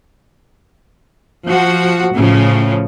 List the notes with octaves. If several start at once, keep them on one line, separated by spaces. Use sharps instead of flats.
F3 F#4
A2 C#3 F3